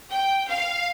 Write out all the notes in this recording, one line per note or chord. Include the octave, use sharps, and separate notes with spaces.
G5
F5